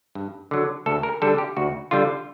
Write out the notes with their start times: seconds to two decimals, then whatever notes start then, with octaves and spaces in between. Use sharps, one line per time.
0.15 G2
0.51 D3 F#3
0.86 D2 A4
1.03 A#4
1.22 D3 G3 A4
1.38 G4
1.57 D2 F#4
1.91 D3 G3 F4